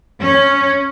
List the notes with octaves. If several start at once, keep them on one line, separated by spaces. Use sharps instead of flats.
C#4